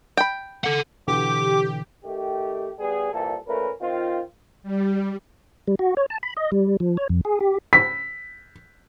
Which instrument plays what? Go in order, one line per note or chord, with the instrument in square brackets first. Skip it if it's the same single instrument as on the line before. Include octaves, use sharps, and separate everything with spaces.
[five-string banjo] G5 B5
[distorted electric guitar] A4 F#5
[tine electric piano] B2 D3 E3 [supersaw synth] G4 [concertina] D6
[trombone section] D#3 A3 G4
G3 B3 G#4
C2 A#2 E3 A4
A#2 A3 C#4 A#4 B4
D#3 C4 F4
[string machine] G3
[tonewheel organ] G3
F#4
C#5
A5
B5
D#5
G3
F3
C#5
F2
G#4
G4
[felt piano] B6